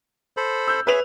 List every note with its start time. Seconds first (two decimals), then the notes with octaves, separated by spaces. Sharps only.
0.37 A4 C5 B5
0.68 E6 G6
0.87 G#4 B4 C#5 E5 F7